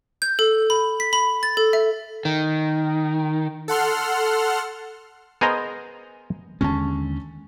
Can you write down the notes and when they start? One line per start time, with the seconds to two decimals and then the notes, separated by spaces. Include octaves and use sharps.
0.22 G6
0.39 A4
0.70 B5
1.00 B6
1.13 B5
1.43 A6
1.57 A4
1.73 E5
2.25 D#3
3.68 A4 F#5 C6 F6
5.41 B3 G#4 A#4 C5 D#5 A#5
6.61 D#2 D3 G#3 C#4 A5